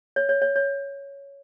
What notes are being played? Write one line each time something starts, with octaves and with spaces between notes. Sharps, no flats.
C#5
C#5
C#5
C#5